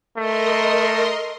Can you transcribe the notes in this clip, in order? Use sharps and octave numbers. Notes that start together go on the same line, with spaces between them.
A3 A#4 D#5 C6